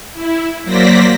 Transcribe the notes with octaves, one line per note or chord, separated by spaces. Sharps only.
E4
F#3 A#3 C5 D5 A#6 B6